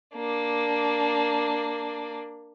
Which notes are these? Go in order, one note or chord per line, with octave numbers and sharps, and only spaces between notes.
A#3 D4